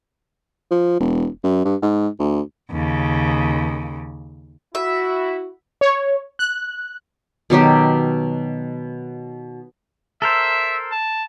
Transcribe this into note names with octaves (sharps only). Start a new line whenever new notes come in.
F3
E1
F#2
G2
G#2
D2
D#2 C#3
E4 F#4 E5
C#5
F#6
B2 D#3 F#3 G4
A4 A#4 C5 E5
A5